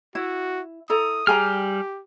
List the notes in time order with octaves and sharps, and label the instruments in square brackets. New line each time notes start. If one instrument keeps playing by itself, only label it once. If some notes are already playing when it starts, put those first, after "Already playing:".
[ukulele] E4 [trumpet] F#4
[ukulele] E4 A4 A#5 [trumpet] D#6
[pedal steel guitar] G3 F6 [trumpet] G4 [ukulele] G#4 G#5 A#5